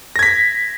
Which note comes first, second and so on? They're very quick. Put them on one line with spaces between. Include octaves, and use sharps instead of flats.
A#6 G#6 B6